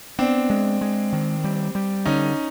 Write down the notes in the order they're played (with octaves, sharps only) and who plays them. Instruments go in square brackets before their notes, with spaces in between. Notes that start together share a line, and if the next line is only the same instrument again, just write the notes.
[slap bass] B3 [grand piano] C4 D4
[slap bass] G#3
G#3
D#3
G3
G3
[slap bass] D3 [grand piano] C#4 D#4